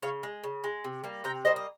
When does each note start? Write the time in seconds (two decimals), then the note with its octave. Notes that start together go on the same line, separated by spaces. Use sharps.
0.02 C#3 C#5 F5
0.23 G#3
0.44 C#3
0.64 G#3
0.84 C3
1.04 G3 A#3
1.24 C3 G5 A#5
1.45 G3 A#3 C5 D#5
1.56 D#5